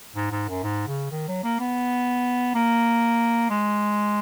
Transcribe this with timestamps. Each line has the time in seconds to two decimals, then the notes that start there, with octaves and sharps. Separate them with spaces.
0.16 G#2
0.32 G#2
0.49 F#2
0.64 G#2
0.87 C#3
1.11 D#3
1.28 F#3
1.44 A#3
1.59 B3
2.55 A#3
3.50 G#3